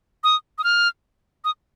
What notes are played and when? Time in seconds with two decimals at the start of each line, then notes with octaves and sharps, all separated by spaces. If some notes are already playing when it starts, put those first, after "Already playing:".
0.24 D#6
0.58 D#6
0.64 F6
1.44 D#6